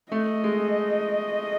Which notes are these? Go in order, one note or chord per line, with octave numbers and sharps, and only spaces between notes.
A3 D#5
G#3